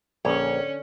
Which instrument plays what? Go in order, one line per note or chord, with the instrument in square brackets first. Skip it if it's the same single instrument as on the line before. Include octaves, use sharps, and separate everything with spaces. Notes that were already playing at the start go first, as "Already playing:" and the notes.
[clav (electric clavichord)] A#1 [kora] D3 C#5 [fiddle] C#4